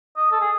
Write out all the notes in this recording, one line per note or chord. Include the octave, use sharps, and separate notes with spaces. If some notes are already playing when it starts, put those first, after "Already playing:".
D#5
A4
G#4